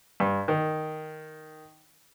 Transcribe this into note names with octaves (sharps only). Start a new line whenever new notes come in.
G2
D#3